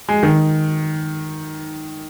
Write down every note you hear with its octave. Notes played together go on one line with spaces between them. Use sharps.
G#3
D#3